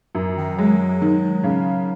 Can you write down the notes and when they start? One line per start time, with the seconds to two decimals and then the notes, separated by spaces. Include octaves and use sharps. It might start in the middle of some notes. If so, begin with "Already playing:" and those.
0.15 F#2
0.37 D#3
0.58 F#3 G#3
1.02 D#3
1.44 C#3